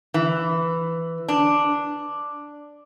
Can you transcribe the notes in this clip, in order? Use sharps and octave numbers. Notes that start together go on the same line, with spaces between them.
E3
D4